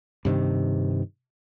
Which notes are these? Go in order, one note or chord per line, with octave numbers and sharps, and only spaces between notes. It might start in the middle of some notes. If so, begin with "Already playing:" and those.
G2 C3 D#3